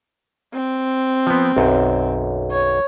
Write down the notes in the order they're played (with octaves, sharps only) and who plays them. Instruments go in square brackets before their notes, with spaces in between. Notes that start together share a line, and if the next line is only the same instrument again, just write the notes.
[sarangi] C4
[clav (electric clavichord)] F3 B3
B1 F#2
[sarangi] C#5